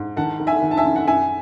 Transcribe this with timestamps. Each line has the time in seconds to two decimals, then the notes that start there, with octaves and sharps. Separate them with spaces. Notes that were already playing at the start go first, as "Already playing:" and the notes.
Already playing: G#2
0.17 D#3 F#5 A5
0.40 D#3
0.47 E5 G#5
0.62 D#3
0.71 A5
0.77 E5 G#5
0.85 F#2
0.96 F#5
1.07 F#2 E5 G#5